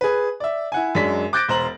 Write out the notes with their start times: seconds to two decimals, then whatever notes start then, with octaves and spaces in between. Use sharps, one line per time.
0.01 G#4 B4
0.40 D5 E5
0.72 E4 F#5 G#5
0.95 F#2 F#3 G#3 D4 B6
1.33 D6 F#6 G6 A6 A#6 D7
1.48 E1 C5 A#5 F#7